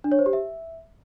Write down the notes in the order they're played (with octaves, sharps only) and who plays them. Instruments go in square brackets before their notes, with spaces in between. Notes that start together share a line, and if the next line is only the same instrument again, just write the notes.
[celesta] D4
C#5
C5
G4
E5